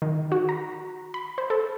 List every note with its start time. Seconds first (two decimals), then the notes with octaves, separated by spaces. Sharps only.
0.02 D#3
0.32 F#4
0.49 A#5
1.14 B5
1.38 C5
1.50 A4